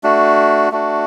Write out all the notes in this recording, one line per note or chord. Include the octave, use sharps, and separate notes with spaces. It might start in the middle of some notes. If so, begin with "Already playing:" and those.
A3 D4 F#4
A3 D4 F#4